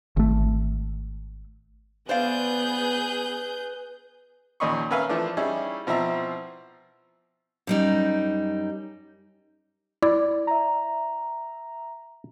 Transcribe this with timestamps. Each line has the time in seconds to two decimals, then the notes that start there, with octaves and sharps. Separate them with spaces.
0.17 G#1 A3
2.09 B3 G#4 B4 C5 D5 F5 G6
4.60 D#2 A#2 C#4 D#5 B5 C#6
4.91 C#4 A#4 B4 E5 F5 G#5
5.09 E3 F3 A3 D4
5.37 G3 C#4 D#4 E4 G#4
5.87 B2 F3 C4 E4 E5 A#5
7.67 F#2 G3 D#4
10.03 E4 D5
10.47 E5 A#5